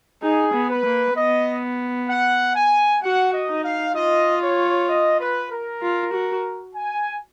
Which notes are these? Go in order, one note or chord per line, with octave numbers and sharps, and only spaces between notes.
D#4 G#4
B3
B4
A#3
B3 D#5
F#5
G#5
F#4 F#5
D#5
D#4
F5
F4 D#5
C#5
D#5
B4
A#4
F4
F#4
G#5